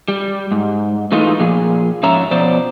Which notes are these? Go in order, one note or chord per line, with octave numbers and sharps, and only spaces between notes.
G3
G#2
E3 G#3 A3 D#4 F4
A#2 F3 G#4
G#2 F3 C#4 C#5 E5 A#5
B2 F3 C5 D5